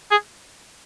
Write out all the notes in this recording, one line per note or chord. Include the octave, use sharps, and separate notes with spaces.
G#4